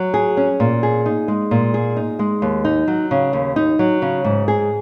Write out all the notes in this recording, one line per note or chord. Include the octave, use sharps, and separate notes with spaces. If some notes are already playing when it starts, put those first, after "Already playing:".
Already playing: F#3
G#4
C#4
A#2
G#4
D#4
G#3
A#2
G#4
D#4
G#3
D#2
D#4
F#3
C#3
D#2
D#4
F#3
C#3
G#2
G#4